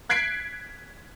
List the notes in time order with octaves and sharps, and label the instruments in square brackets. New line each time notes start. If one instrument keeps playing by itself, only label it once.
[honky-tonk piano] F#6 G#6 B6 C7 D7